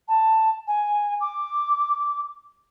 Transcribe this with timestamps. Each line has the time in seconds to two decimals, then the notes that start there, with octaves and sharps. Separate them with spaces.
0.08 A5
0.67 G#5
1.21 D6